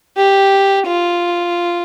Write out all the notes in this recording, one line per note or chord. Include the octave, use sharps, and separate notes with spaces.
G4
F4